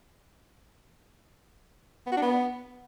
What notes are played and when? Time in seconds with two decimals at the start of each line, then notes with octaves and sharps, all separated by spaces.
2.07 B3
2.12 F#4
2.17 D4
2.22 B3